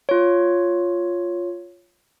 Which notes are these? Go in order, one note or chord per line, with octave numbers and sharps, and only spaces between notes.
F4 C#5